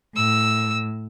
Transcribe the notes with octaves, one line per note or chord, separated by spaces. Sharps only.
A2 E6